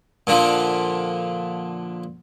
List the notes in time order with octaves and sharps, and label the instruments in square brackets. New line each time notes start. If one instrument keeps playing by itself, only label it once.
[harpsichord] A#2 D3 F3